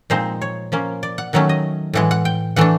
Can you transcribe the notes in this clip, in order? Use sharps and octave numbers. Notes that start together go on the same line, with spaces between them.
A#2 F3 G#3 C4 D#4 C5
C#5
F3 A#3 C#4
D5
F#5
D#3 F#3 A3 C#4 F#5
D#5
A2 E3 G#3 F#5
F#5
G5
E3 A3 D4 F#5